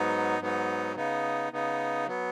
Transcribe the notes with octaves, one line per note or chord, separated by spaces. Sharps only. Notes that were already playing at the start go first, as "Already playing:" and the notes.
Already playing: G#2 F#3 B3 D#4
G#2 F#3 B3 D#4
C#3 B3 D#4
C#3 B3 D#4
F#3 B3